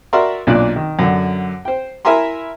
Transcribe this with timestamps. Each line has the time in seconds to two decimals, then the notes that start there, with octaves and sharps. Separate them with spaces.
0.13 F#4 A#4 D5 E5 A#5 C6
0.47 B1 A#2 D4 D5 F#6
0.76 D#3
0.99 F#2 D3
1.65 C5 G5
2.05 E4 A#4 E5 G#5 A#5 C6